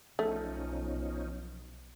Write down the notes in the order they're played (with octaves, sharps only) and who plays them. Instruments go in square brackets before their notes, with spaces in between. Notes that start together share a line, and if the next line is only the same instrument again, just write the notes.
[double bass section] B1 [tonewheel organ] F3 C#4 D#4 [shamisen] A3